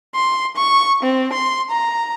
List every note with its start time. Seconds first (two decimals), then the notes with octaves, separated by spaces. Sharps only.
0.15 C6
0.57 C#6
1.03 C4
1.33 C6
1.70 A#5